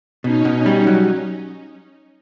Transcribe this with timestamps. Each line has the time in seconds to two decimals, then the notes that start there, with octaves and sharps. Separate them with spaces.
0.24 B2 C#4 D#4
0.45 B2
0.66 G3
0.87 F#3